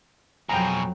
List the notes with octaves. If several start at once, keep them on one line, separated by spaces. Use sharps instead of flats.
F2 B2 F#3 G#4 G5 A#5